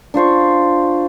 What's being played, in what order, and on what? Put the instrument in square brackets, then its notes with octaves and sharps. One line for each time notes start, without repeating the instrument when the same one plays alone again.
[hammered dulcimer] D4 F4 C5 C#6